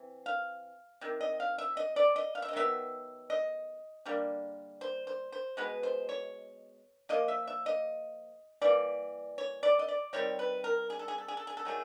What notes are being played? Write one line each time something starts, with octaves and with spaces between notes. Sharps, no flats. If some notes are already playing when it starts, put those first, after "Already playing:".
Already playing: E3 C4
F5
C3 D#3
D#5
F5
E5
D#5
D5
D#5
F5
E5
D#5
D#3 F#3 B3 E5
D#5
D3 G3 A#3
C5
C5
C5
B2 G#3 B3 B4
C5
C#5
F3 A#3 D#5
E5
E5
D#5
E3 G3 A#3 D5
C#5
D5
D#5
D5
D#3 G3 C4 C#5
B4
A#4
G#4
A4
G#4
A4
G#4
A4
G#4
A4
D#3 F#3 A3 G#4